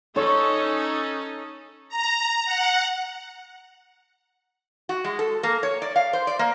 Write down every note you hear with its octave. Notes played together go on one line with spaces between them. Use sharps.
C#4 D#4 A4 C#5
A#5
F#5
F#4
G#3
A4
A#3
C#5
D5
F5
C5
D5
A#3